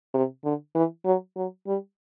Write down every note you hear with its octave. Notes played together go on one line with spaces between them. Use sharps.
C3
D3
E3
F#3
F#3
G3